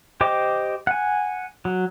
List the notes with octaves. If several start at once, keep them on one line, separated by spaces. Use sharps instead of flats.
G4 C5 D#5 G5 D6
F#5 G#5
F#3